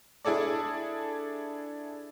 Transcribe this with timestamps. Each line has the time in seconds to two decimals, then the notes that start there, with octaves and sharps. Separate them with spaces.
0.25 D4 E4 G#4 A4 D5